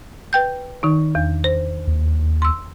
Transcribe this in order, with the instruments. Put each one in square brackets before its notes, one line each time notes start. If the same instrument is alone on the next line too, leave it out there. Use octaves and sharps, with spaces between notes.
[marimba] B4 G5 G6
D#3 D#4
E2
C5
[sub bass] D#2
[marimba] C6 E6